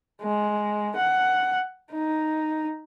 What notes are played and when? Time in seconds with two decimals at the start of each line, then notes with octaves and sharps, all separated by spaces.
0.22 G#3
0.97 F#5
1.92 D#4